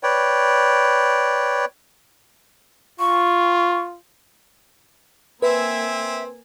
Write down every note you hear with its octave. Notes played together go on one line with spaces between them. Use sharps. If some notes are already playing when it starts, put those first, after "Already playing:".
B4 C#5 D5 G5
F4 C#6
A#3 C4 B4 E5 G#5